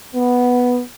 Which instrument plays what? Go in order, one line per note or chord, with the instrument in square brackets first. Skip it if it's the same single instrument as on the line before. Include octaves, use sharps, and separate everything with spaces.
[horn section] B3